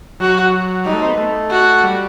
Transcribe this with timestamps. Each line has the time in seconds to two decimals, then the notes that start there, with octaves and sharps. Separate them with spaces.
0.20 F#3 F#4
0.86 G3 D#4
0.93 A3
1.02 C4
1.10 B3
1.18 A3
1.50 F#4
1.83 G3